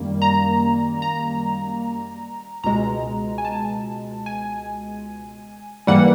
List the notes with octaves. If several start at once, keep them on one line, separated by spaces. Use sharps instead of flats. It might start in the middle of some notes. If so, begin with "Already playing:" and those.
Already playing: F#2 D#3 G3 A#3
A#5
A#5
C#2 B2 G#3 A#5
G#5
A5
G#5
G#2 E3 G3 A#3 F#5